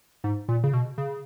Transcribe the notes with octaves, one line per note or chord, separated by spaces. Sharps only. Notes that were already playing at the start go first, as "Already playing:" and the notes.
G#2
A#2
C#3
B2
C#3